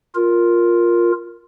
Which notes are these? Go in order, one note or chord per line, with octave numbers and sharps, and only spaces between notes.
F4 A#4